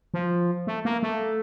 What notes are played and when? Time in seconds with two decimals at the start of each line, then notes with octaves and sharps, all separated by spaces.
0.14 F3
0.67 A3
0.85 A#3
1.03 A3